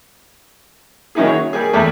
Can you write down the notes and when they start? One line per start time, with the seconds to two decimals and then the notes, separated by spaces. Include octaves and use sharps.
1.15 D#3 F#3 C#4 D#4 E4 G#4
1.28 C#5
1.53 G3 A#3 G#4
1.73 E2 G3 A3